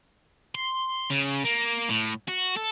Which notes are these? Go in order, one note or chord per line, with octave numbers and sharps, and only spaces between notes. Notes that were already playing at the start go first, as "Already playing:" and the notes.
C6
C#3
A#3
A2
F#4
A4